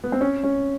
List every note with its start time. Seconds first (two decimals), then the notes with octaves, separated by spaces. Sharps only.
0.04 B3
0.12 C4
0.21 C#4
0.43 C#4